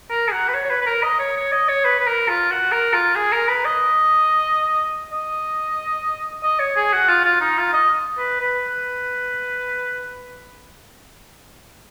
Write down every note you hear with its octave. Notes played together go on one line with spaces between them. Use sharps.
A#4
G#4
F#4
B4
C#5
C#5
B4
B4
A#4
D#5
C#5
C#5
D#5
C#5
B4
B4
A#4
F4
F#4
A#4
F4
G#4
A#4
B4
D#5
D#5
D#5
C#5
G#4
F#4
F4
F4
D#4
F4
D#5
B4
B4